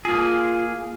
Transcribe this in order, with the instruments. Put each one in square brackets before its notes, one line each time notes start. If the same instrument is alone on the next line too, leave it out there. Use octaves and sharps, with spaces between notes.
[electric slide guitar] A#3 G#4 [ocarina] F4